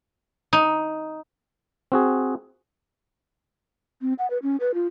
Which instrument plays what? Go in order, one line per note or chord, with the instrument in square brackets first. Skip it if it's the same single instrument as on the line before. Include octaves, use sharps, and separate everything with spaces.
[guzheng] D#4
[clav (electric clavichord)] C4 F#4 G#4
[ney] C4
F#5
B4
C#4
B4
F4